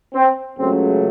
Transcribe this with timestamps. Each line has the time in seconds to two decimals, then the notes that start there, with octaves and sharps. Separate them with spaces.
0.14 C4
0.58 C#2 C#3 F#3 A3 C4